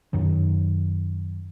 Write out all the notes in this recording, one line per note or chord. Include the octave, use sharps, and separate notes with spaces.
F#2 D#3 F#3